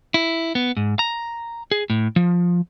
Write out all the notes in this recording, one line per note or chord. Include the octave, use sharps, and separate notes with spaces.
E4
B3
G#2
A#5
G#4
A2
F3